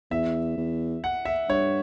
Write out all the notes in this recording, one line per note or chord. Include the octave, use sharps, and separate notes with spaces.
E2 E5
E2
F#5
E5
G2 C#5